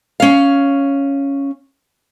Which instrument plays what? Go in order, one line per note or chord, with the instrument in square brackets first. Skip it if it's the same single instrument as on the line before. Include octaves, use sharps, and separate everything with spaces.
[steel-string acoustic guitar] C#4 F5